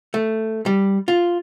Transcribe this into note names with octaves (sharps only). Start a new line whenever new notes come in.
A3
G3
F4